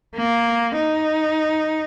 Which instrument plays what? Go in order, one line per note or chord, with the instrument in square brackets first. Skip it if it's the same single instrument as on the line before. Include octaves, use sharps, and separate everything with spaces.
[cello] A#3
D#4